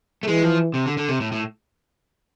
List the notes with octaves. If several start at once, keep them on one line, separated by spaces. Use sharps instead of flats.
A3
E3 G#3
F3
C3
D3
D3
C3
A2
A2